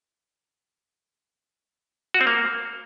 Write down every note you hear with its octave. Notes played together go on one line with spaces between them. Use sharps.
F#4
C4
A#3